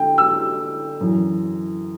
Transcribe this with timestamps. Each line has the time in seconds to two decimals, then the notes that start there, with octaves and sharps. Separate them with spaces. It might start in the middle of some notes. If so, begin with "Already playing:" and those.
Already playing: D3 G5
0.18 E6
1.00 F#2 E3